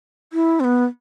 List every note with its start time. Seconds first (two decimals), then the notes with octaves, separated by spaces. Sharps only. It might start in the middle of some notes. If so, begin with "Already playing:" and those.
0.33 E4
0.60 C4
0.64 B3